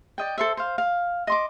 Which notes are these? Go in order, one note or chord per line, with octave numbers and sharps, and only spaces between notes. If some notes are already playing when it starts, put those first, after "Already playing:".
D5 D#5 G5
A4 C5 E5
C5 F5
F5
D#5 C6 D6